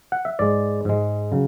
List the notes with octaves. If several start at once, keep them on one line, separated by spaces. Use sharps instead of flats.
F#5
E5
G#2 G#3 D5
G#2 G#3
C#3 F#3